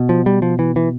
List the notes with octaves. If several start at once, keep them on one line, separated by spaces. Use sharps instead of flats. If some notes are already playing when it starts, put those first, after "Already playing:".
Already playing: B2
F3
G3
F3
E3
E3